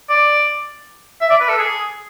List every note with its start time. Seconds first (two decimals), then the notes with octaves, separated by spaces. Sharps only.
0.09 D5
1.21 E5
1.30 D5
1.40 B4
1.49 A4
1.59 G#4